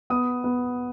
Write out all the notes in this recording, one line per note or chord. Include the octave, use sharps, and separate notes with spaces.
B3 D#6
B3